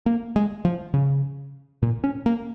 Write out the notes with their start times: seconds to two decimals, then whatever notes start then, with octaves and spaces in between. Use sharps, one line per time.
0.06 A#3
0.36 G#3
0.65 F3
0.94 C#3
1.82 A#2
2.04 C#4
2.26 A#3